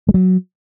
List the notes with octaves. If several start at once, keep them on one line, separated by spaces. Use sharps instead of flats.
G#3
F#3